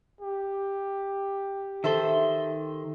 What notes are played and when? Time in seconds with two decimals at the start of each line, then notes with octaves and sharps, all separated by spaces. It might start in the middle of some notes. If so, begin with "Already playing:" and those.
0.21 G4
1.84 D#3 A4 C5 E5 C6